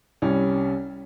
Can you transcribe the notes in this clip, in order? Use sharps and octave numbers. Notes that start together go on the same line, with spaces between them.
C2 G3 C#4